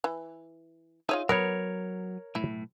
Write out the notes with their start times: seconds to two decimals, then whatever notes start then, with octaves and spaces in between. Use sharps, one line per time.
0.04 E3
1.09 D#4 F4 G#4 C#5 D#5 E5
1.29 F#3 B3 A#4 B4 C#5
2.35 B1 A2 E4